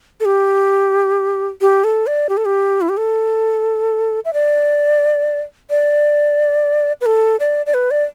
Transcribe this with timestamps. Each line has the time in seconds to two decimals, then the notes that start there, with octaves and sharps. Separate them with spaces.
0.20 A4
0.25 G4
1.61 G4
1.84 A4
2.07 D5
2.29 G4
2.37 A4
2.45 G4
2.81 E4
2.89 G4
2.97 A4
4.25 E5
4.33 D5
5.70 D5
7.01 B4
7.06 A4
7.40 D5
7.66 D5
7.74 B4
7.91 D5